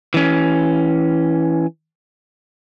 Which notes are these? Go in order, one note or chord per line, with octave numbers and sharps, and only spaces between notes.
E3 C#4